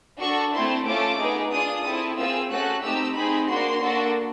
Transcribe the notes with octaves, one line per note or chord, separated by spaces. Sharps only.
D4 F#4 A4 C#6
A3 C4 E4 A4 C6
A3 C#4 F4 A4 D6
B3 D#4 G#4
D4 F4 G#4 D#6
C4 E4 A4
C4 F4 G#4 E6
A3 C#4 F#4 A4 F#6
A3 C4 D#4 G4 E6
C4 D#4 G#4 B5
A#3 D4 F#4 C6
A#3 D4 F#4 A4